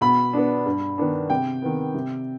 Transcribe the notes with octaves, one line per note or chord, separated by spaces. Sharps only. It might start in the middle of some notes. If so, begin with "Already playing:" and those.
B2 B5
B3 D4
G2
D#3 B3 D4
C3 G5
D#3 B3
C3